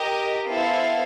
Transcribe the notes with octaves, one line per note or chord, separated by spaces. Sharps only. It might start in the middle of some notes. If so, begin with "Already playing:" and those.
Already playing: G4 A#4 D#5
B3 E4 A4 C5 F5